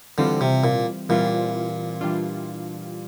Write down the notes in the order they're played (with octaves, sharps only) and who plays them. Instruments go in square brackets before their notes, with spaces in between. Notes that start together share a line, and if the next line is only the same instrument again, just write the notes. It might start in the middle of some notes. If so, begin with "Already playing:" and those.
[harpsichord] D3 [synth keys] E3 G3 C4 F4
[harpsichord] C3
A#2
[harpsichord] A#2 [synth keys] E3 G3 C4 F4
[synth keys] E3 G3 D4 F4